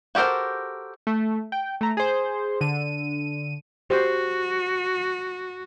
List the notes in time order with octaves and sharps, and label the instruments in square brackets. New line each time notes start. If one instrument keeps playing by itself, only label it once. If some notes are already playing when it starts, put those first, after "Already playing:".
[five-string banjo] F#4 G4 A4 A#4 C5
[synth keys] A3
G5
A3 A#5
G#4 C5
D3 D#7
[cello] F#4 [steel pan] G4 C5